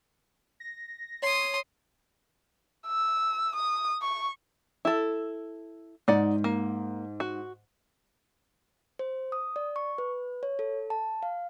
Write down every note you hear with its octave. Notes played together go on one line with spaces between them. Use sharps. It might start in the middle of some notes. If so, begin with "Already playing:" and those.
A#6
C#5 C6 D#6
E6
D#6
C#6
E4 A4
G#2 D#4 D5 F#5
A#3
F#4
C5
D#6
D5
C#6
B4
C#5
A4
A5
F5